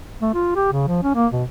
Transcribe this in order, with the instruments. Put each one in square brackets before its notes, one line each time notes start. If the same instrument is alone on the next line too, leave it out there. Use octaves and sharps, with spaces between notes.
[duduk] A3
F4
G4
C#3
F3
C#4
A#3
B2